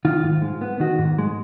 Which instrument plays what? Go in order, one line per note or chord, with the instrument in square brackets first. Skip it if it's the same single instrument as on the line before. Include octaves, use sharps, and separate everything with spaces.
[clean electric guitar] D#3 F4
G#2
G#3
B3
D#3 F#4
G#2
G#3